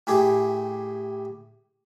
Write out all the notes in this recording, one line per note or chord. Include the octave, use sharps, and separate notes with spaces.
A2 E4 G4 G#4